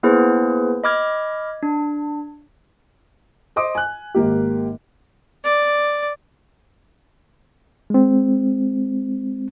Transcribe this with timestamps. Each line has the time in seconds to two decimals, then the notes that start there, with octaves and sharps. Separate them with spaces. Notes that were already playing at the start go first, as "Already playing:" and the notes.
0.03 A#3 B3 E4 G#4 B4 C5
0.84 D#5 B5 D6 F6 G#6
1.63 D4
3.56 C5 D#5 C6 D6 D#6
3.75 G#5 F#6
4.15 G#1 A#3 G4
5.44 D5
7.90 G#3 C4